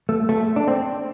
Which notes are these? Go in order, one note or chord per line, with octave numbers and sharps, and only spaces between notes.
A3
A3
D4
C4